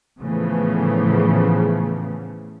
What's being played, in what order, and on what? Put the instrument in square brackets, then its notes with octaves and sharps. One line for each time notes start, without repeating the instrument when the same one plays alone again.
[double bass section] A2 C#3 E3 F3 A3 B3